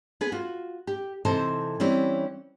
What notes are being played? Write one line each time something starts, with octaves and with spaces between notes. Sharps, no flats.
B3 G#4 B4
F4 F#4
G4
C3 E3 D#4 A4 C5 A5
E3 G3 C4 C#4 E4